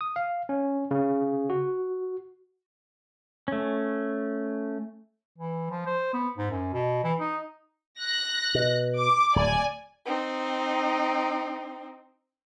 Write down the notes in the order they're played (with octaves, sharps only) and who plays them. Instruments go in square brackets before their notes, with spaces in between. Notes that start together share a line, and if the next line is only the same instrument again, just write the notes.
[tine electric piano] D#6
F5
C#4
C#3
F#4
[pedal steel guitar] A3 C#4
[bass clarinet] E3
F3
C5
B3
G#2
F#2
B2
E3
D#4
[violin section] F#6 A#6
[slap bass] B2
[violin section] D6
[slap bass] D1 [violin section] D5 G#5
[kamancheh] C4 D#4